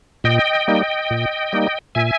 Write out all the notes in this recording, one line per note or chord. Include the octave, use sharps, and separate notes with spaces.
A#2 D#5 G5
G3 A#3 D#4
A#2
G3 A#3 D#4
A#2 E5 G#5